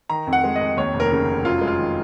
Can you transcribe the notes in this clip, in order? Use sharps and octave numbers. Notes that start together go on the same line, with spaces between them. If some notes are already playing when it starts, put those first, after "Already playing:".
D#3 A#5
F2
F#5
G#3
D#5
F2
D#2 C#5
F1
A#4
C#3
F1
F#2 F4
G#3
F4
D#3